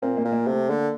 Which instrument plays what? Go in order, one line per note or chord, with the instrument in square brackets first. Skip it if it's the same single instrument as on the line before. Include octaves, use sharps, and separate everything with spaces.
[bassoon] A#2 [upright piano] C4
[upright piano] A#3
[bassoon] A#2
[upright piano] A#3
[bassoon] C3 [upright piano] A3
[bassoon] D3 [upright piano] A#3